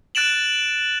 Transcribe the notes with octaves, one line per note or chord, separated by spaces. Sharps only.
F#6 A6 D7 E7 F#7